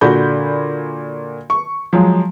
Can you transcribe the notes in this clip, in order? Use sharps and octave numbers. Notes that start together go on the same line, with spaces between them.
A#2 D3 F#4 B5 G6
C#6
F3 F#3 G#3